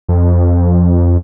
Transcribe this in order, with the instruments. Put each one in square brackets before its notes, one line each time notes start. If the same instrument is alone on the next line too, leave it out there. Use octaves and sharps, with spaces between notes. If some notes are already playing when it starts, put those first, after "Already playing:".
[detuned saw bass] F2